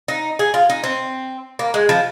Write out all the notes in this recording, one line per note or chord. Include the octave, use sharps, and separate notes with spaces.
D#4
G#4
F4
D#4
C4
A#3
G#3
F3